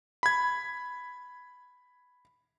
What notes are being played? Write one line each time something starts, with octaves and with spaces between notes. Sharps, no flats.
B5 G#6